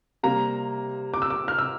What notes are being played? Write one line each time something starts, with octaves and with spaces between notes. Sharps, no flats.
C3 G3 A#3 A#5
D6
E6
D6
F6
E6